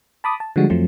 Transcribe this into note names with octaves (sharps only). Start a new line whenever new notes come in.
A5 B5 D6 D#6
A5
D3 F3 G3 G#3 F#4
F2 F3 F#3 A3 C4